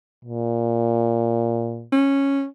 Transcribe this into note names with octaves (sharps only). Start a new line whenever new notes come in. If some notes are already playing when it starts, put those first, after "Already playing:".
A#2
C#4